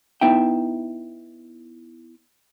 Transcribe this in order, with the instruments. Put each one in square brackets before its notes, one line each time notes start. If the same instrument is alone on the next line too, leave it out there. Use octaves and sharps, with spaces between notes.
[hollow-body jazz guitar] B3 D#4 E4 E5 G5